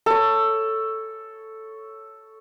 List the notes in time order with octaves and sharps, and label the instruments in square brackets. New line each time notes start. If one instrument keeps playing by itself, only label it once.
[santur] A4 C#5